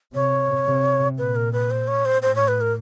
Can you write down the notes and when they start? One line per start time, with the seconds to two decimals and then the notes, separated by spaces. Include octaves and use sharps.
0.14 C3 C#5
0.66 C3
1.18 A#2 B4
1.36 A#4
1.53 B4
1.71 C5
1.88 C#5
2.05 C5
2.22 A2 C5
2.36 C#5
2.48 B4
2.61 A#4